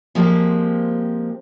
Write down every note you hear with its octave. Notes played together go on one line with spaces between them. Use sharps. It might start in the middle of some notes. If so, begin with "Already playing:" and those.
F3 G#3 A#3 C4 G4